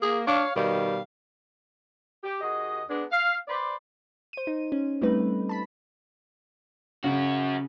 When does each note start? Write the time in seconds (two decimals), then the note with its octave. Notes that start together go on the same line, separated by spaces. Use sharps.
0.02 A#3 G#4
0.27 D4 C#5 F5
0.56 B2 D#3 G3 F5
2.23 G4
2.41 D#2 F#4 G#4 D#5
2.87 G#3 B3 D4
3.10 F5
3.47 B4 C5 D5
4.33 C5 D#7
4.47 D#4
4.72 C#4
5.01 G3 A3 C4 D#4 B4
5.49 A5 B5 B6
7.04 C#3 C#4 F#4